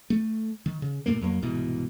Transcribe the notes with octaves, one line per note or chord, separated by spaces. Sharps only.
A3
D#3
C#3
G2 A#2 A3 A#3
F2 F#3 A3 A#3
C2 G#2 B2 E3